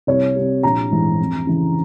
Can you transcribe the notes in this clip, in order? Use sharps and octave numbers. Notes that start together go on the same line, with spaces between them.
C2 C#5
C3 G3
A#1 A#5
G#2 E3
F2
C#3 E3